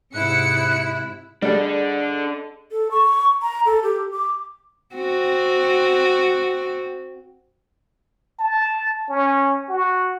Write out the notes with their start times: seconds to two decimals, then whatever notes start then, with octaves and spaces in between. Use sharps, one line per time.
0.14 G#2 C3 E4 F#6 C#7
1.42 G3 D4 G#4 A4 D#5
2.72 A4
2.91 C#6
3.42 A#5
3.66 A4
3.83 G4
4.12 D6
4.95 C4 F#4
8.39 A5
9.09 C#4
9.69 F#4